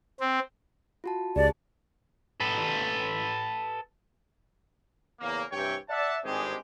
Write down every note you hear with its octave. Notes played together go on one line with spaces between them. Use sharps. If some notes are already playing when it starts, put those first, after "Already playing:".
C4
F4 F#4 A5
C#2 G4 G#4 D5 A5
A4 B4
E2 C#3 A#3
G2 C3 E3 G4 C#5 G5
D5 E5 F#5 A5
G#1 G2 G#3 C4 G4 G#4